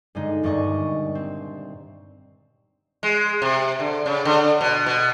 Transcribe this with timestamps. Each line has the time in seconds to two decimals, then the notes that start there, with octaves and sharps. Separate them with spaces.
0.15 G2 D3 G#3 D#4
0.43 D#1 G2 D5 D#5 C#6
1.15 C4
3.03 G#3
3.42 C3
3.80 D3
4.06 C#3
4.25 D3
4.61 B2
4.86 B2